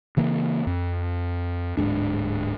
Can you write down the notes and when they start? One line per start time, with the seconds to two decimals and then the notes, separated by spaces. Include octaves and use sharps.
0.17 C#3 E3 A#3
0.67 F2
1.77 D1 A#1 G#2 D4